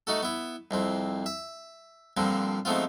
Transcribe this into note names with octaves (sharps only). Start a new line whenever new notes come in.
A3 D#4 F#4 A4
B3 E4
C2 F2 C4
E5
G2 A#2 D3 F3 C4
G#2 F3 A3 B3 C4 F4